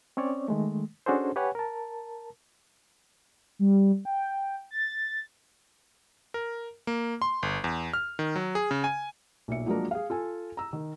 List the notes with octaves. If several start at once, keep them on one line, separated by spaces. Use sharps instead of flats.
C4 C#4 C#5 D5
D#3 G#3 A3
C#4 D4 F#4 G#4 A4 C5
G4 B4 C#5 F#5 G#5
A#4 A5
G3
G5
A6
A#4
A#3
C6
G1
E2
F6
D#3
F#3
G#4
C#3
G#5
B1 A#2 E5 C#7
F3 F#3 G#3 A#3 D4 A#4
G#4 F5
F4 A4 G#5
A#5 E6
D#3